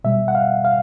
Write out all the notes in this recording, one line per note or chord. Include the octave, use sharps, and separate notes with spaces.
B2 G3 E5
F#5
F5
F5